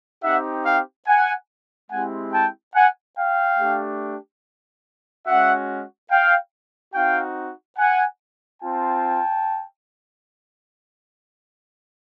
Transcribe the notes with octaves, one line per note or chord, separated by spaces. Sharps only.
C4 D#4 G4 E5 F#5
F5 G5
F#5 G#5
G#3 C4 E4 G4 F#5 G#5
G5 A5
F#5 G#5
F5 G5
A3 D4 G4
G#3 C#4 F#4 E5 F#5
F5 G5
C4 D#4 F#4 F5 G5
F#5 G#5
C4 F4 G5 A5